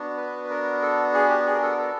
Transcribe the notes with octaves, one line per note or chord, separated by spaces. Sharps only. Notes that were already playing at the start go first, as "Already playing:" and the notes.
Already playing: B3 D4 F#4
B4
B4
A#4
A4
G#4
G4
G#4
A#4
A4
A#4
A4